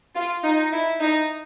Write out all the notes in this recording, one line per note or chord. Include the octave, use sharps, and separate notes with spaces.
F4
D#4
E4
D#4